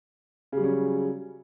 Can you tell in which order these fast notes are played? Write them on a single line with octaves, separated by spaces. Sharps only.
C#3 G3 F#3 C#4